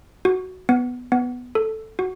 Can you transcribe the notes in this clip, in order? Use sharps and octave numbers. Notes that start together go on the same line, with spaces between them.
F#4
B3
B3
A4
F#4